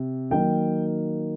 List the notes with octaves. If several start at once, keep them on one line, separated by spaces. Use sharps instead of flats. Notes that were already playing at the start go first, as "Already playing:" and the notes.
Already playing: C3
D#3 F#3 A#3 D#4 G5